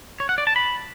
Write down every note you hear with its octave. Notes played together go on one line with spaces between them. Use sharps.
C#5
F#5
D5
A5
B5